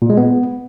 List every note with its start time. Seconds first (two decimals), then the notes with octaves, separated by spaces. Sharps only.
0.02 A#2
0.10 G#3
0.17 B3